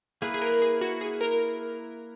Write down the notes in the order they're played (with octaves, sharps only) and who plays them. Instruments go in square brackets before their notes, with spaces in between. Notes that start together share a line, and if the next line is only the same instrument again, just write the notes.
[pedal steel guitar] A#3 E4 B4 [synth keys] G#4
[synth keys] G#4
A#4
G#4
F#4
G#4
A#4